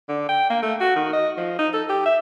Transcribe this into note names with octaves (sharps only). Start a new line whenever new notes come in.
D3
G5
A#3
A3
F#4
D#3
D#5
F3
D#4
A4
G4
E5